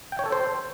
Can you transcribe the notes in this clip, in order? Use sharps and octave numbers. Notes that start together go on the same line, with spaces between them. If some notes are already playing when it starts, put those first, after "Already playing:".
G5
C#5
A4
C5